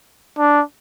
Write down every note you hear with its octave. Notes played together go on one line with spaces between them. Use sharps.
D4